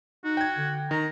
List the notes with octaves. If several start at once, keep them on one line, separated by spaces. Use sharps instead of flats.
D#4 F#4
G5 G#6
D3
D#3 A#5